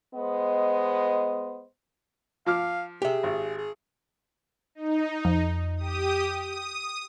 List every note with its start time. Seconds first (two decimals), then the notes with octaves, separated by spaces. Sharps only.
0.14 G#3 B3 C5 D#5
2.46 F3 F5 D6 F6
3.02 G4 G#4 E5
3.23 G#1
3.57 G#4
4.75 D#4
5.25 F2
5.77 G4 D#6
6.42 D#6